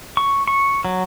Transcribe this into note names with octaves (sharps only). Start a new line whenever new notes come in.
C#6
C#6
F#3